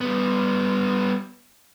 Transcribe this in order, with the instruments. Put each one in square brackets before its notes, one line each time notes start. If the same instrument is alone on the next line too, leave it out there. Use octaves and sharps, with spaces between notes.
[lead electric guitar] G3 B3